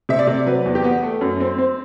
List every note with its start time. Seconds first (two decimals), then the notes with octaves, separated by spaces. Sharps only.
0.09 C3 E5
0.19 D5
0.27 C3
0.46 F#3 B4
0.65 E2
0.75 G4
0.84 B3
1.03 A3
1.21 F#2
1.40 C4
1.58 C4